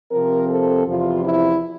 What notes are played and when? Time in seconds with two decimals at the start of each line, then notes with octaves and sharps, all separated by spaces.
0.11 C3 F3 C4 A#4
0.50 A4
0.86 E2 C3 F3 F4
1.24 E4